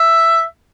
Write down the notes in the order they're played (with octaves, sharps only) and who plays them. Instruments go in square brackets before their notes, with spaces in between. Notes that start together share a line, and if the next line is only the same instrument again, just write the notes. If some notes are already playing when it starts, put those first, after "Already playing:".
Already playing: [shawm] E5